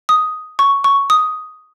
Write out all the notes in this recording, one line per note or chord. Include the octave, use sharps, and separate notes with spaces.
D#6
C#6
C#6
D#6